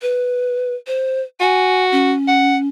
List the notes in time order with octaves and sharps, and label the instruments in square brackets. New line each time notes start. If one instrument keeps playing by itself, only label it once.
[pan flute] B4
C5
[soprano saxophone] F#4 [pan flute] G#5
[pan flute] C#4
[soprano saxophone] F#5